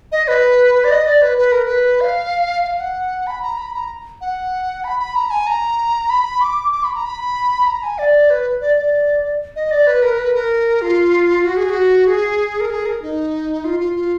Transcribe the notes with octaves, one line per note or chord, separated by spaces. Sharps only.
D#5
B4
B4
D5
D#5
D5
B4
B4
A#4
B4
F5
F5
F#5
B5
A#5
B5
A#5
F#5
B5
B5
A#5
G#5
A#5
B5
D6
D6
B5
A#5
B5
A#5
G#5
D5
B4
D5
D5
D#5
D5
B4
A#4
B4
A#4
F4
F#4
G#4
F#4
G#4
A#4
G#4
A#4
D#4
F4
F4
F4